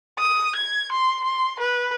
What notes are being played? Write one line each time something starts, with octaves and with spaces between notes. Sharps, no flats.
D#6
G#6
C6
C6
B4